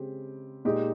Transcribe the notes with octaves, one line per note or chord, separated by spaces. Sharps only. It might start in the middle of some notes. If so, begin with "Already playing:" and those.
Already playing: C#3 G#3 C4 G4
A#2 G#3 D#4 G4